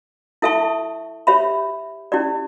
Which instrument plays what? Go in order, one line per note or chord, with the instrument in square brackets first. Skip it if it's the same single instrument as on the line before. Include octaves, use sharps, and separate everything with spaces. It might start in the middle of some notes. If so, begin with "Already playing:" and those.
[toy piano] E4 A4 E5 A5 C#6
G4 C#5 E5 B5
C#4 E4 G4 D5